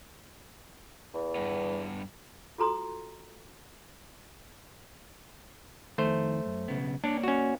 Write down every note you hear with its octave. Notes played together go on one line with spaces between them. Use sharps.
E2
G2 B3
F4 F#4 A4 A#5 C6 D#6
F2 D#3 A3 C5
F#2
B1 C#3 B3
A#3 D4 C#5 D5
C#4 F#4